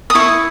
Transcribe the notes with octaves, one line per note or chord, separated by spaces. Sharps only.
D#6
E4 C#6